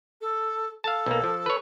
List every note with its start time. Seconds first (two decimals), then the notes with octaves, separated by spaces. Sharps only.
0.21 A4
0.84 A4 F5 A5
1.06 B1 A#3
1.24 F3
1.46 B4 C#5